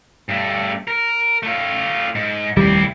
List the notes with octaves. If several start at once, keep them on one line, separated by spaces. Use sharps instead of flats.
G2 A3
A#4
A3 F4
G#2
F1 D#2 G3 C4 E4